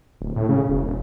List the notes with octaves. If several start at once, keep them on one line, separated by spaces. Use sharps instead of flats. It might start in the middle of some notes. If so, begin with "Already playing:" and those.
D1
A2
C#3
E1